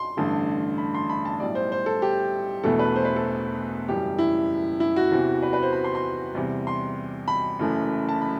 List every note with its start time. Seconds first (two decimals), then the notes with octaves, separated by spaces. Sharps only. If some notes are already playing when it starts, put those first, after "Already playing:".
Already playing: C6
0.17 A1 G2 D3 A3
0.78 B5
0.94 C6
1.10 B5
1.25 A5
1.40 B1 A2 G3 D5
1.55 C5
1.72 C5
1.86 A4
2.02 G4
2.64 E1 E2 B2 A3 A4
2.79 B4
2.96 C5
3.05 B4
3.16 A4
3.88 F#1 F#2 E3 G3 G4
4.18 E4
4.80 E4
4.96 F#4
5.12 E2 C3 E3
5.43 B4
5.53 B4
5.63 C5
5.73 B5
5.84 C6
5.95 C6
6.35 E2 C3 G3
6.67 C6
7.28 B5
7.59 F#1 F#2 E3 A3
8.09 A5
8.22 B5